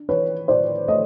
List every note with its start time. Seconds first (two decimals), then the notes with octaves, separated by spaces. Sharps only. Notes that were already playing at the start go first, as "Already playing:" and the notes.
Already playing: D4
0.09 E3 B4 C#5
0.48 A2 C5 D5
0.88 A3 C#5 D#5